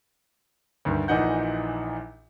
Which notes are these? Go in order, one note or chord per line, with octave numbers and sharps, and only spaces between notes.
D2 G2 D#3
A#1 A#2 E3 D#4 F#5 G6